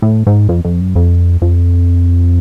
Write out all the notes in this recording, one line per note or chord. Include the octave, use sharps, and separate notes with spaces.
A2
G#2
F2
F2
F#2
F2
F2